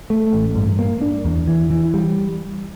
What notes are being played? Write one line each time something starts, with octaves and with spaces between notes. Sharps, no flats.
A3
A1
G2
A#3
D4
E2
E3
E3
G3